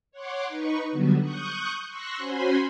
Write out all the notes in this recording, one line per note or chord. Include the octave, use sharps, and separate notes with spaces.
C#5 F#5 C6 D6
D#4 B4 C#6
D3 F#3 G3 B3 F#4
C#6 D#6 F#6 G6
C6 C#6 E6 F#6 A#6
C#4 F#4 C5 G#5 B5 C6